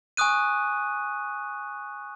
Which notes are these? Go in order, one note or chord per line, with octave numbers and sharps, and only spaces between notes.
G#5 C#6 D#6 F#6 D#7